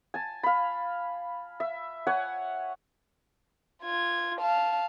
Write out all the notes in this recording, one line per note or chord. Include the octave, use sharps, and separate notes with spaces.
G#5 A5
F5 B5
E5
C#5 F#5 G#5
F4 G#6
F5 A5